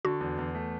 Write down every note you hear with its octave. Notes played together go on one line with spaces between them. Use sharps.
D3 F#4
E2
E2
A3